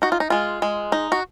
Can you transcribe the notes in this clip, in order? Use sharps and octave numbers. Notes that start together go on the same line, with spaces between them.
D#4 F#4
F4
D#4
G#3 F4
G#3
D#4
F#4